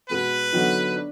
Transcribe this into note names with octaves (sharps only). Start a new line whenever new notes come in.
B2 G#3 B3 B4
D3 F#3 B3 D#4
D4